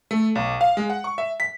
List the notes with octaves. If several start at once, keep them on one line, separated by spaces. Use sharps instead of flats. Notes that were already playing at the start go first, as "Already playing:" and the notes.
A3
B1
F5
G#3
F#5
C#6
E5
B6